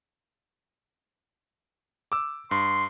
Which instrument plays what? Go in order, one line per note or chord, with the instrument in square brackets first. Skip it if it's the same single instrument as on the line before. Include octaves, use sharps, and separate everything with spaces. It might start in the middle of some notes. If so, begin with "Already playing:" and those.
[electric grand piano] D6 E6
[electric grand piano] G2 [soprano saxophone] C6